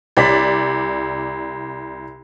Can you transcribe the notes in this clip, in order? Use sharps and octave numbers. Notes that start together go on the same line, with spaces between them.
C2 D5 B6